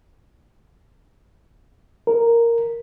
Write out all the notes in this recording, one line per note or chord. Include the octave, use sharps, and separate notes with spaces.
A#4